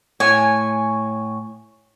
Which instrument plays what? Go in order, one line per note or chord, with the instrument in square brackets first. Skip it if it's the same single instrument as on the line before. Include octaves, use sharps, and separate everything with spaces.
[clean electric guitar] A2 C#5 [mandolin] G#5